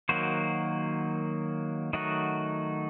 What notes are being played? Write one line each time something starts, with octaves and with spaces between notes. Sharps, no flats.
D#3 F#3 A#3 F#4 C5
D#3 F#3 A3 D#4 F#4